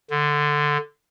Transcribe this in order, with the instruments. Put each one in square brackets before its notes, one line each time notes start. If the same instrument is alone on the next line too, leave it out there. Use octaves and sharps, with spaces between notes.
[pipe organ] D3